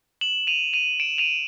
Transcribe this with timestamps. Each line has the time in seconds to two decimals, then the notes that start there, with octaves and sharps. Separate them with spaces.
0.21 E7 F#7
0.47 D#7 F7
0.73 D#7 F7
1.00 D7 E7
1.18 D#7 F7